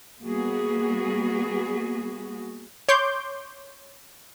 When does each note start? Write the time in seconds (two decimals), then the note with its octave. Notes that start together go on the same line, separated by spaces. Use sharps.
0.21 G3 A#3 B3 F#4 G#4
2.89 C#5 C6 D6 G6